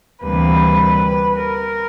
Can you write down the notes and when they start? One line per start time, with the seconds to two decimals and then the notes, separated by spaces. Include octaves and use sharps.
0.23 D2 C3 E3 G3 A#3 B4
1.38 A#4